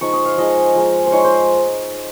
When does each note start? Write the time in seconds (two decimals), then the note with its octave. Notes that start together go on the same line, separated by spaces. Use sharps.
0.01 F3 G#3 D#4 C#6
0.13 D#6
0.25 F5
0.38 F3 G#3 D#4 D#5
0.75 F3 G#3 D#4
1.06 C5
1.12 F3 G#3 D#4 C#5
1.24 C5